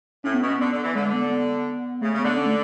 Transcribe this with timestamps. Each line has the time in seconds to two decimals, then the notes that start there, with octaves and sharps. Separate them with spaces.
0.24 A2 C#4
0.34 B3
0.42 B2 C#4
0.59 D3 B3
0.72 D3
0.84 E3
0.95 D3 G#3
1.13 B3
1.30 B3
2.01 C#3 A3
2.13 C#3
2.19 B3
2.25 D3
2.36 C#4
2.46 A3